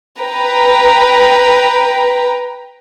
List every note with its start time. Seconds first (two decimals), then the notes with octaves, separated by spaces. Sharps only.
0.20 B4 G5 A#5